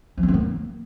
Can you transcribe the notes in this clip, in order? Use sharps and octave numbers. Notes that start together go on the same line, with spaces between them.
F3
C4
D#3
A#3